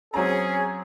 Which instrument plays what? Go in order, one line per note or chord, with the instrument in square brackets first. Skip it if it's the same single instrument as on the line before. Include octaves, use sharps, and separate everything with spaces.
[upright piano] F#3 C4 A#5 [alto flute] C#4 [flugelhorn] G#4